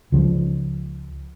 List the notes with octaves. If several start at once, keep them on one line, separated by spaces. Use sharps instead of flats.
C#2 F3